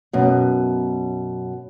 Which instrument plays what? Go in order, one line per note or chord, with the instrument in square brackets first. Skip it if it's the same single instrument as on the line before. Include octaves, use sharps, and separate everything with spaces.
[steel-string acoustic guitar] F#2 B2